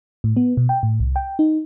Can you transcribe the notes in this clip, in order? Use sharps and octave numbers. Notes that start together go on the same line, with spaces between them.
A2
B3
B2
G5
A2
C2
G5
D#4